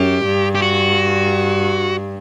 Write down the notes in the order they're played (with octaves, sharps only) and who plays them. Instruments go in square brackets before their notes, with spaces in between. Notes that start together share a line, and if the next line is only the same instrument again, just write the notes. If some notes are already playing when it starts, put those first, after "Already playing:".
Already playing: [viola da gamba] F#2 [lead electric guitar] G4
[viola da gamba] G2
[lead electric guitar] G4
F#4